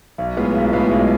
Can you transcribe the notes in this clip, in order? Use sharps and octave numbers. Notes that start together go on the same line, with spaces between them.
B1
A2 G#3 B3 F4
B1
A2 G#3 B3 F4
B1